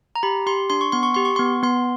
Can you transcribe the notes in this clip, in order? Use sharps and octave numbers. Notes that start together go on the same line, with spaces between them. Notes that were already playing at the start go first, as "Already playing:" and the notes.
A#5
G4 B5
G4 C6
D4 C6
C#6
B3 C6
C#6
G4 C6
C#6
B3 C6
B3 C6